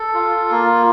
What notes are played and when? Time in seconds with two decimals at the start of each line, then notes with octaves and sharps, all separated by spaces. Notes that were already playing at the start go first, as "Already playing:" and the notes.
Already playing: A4
0.14 F4
0.51 A#3